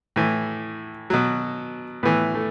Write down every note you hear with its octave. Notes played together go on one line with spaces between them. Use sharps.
A2 E3
B2 F#3
A2 E3 B3
A3